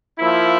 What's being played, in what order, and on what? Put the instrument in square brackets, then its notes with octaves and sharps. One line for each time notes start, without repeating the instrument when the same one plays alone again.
[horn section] F3 A#3 E4